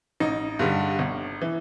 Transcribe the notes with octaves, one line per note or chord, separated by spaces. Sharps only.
A1 D#4
G2 D3 G3
G1
E3